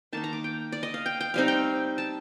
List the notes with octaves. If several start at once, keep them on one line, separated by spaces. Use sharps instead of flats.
D#3 A#3 D#4 A5
A#5
D6
G5
D5
D#5
F5
G5
G5
G3 C4 D#4 F5
G5
A5